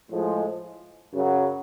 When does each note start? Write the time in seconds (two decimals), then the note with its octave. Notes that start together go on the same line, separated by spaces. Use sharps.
0.10 A2 F3 G#3
1.14 F#2 C#3 F#3